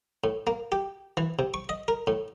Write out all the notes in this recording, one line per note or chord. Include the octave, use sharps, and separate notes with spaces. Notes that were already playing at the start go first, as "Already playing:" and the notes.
A2
A#3
G4
E3
C3
C#6
D#5
A#4
A2